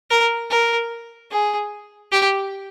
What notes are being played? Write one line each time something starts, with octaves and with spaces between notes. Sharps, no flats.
A#4
A#4
G#4
G4